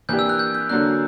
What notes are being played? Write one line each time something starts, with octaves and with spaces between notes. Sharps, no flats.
E3 A#3 D4 G4 G6
E6
F#6
G6
G6
D3 F#3 A#3 D4 F#6